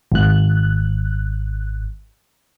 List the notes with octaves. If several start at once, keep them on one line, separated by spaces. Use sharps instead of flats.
G#1 F#6